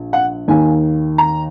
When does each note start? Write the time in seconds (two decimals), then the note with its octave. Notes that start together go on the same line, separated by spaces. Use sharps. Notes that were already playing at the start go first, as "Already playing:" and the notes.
Already playing: A#1
0.13 F#5
0.48 D#2 D#3 A#3 G#5
1.18 A#5